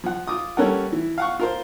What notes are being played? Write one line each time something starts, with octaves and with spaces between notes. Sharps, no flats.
F3 F#5
F4 D6 D#6
G3 A#3 C#4 A4 A#4 F#5
E3
F5 F#5 C#6
F4 A#4 C5